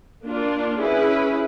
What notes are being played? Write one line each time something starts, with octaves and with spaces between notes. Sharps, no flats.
A#3 D4 F4
C#4 E4 G#4 B4